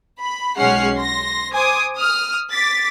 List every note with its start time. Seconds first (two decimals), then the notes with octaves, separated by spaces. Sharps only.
0.20 B5
0.56 B1 G#3 C#4 F#5 F6 C7
0.95 C6 A#6
1.51 C5 G#5 D6 D#6
1.96 D#6 F6
2.51 D6 A6 B6